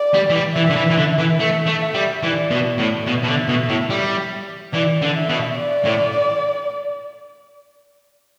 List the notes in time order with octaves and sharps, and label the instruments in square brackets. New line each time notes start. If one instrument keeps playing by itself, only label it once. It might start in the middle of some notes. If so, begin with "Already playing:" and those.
Already playing: [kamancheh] D5
[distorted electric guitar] G3
E3
G3
[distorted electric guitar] E3 [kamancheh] E5
[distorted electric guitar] D3
E3
E3
D3
E3
[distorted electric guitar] A3 [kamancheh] E5
[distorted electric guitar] A3
[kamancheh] E5
[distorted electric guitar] G3
[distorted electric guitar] E3 [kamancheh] D5
[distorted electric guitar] B2
A2
[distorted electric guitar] B2 [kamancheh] E5
[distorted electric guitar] B2
D3
B2
A2
G3
[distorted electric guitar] E3 [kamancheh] D5
[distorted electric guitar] D3
[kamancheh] E5
[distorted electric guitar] B2
[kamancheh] D5
[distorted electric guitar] A2